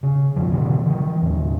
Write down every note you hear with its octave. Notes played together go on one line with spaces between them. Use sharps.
C#3
G1 C2 F2 F3
B2 D3 E3
D3 E3
D#2 A2